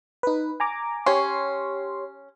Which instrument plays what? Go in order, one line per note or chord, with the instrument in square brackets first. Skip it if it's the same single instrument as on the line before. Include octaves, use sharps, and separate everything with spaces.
[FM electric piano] D#4 B4
G#5 A#5 D6
[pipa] C#4 [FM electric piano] G4 C#5 C6